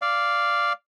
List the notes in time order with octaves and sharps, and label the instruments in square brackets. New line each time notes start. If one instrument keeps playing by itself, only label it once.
[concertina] D5 F5